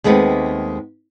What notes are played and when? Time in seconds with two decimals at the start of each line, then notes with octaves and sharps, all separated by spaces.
0.04 D#2 G#3 A3 B3 C4